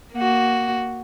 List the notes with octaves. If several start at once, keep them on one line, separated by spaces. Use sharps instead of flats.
A#3 F#4